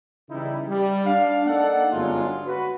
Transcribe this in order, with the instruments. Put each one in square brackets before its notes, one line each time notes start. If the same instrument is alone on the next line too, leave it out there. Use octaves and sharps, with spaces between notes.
[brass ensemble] C#3 E3 G3 D#4 E4
G3
D4 F5
A#3 D#4 A4 D5 F#5
G1 F#2 F#3 G#3 D4 F4
F#4 B4